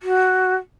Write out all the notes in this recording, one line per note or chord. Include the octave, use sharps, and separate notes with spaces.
F#4